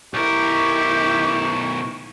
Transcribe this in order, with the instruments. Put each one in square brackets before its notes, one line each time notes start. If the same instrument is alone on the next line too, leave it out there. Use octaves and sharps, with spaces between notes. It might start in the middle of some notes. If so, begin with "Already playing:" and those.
[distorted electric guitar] B1 A#4 [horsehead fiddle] E4 [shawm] G4 [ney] C#6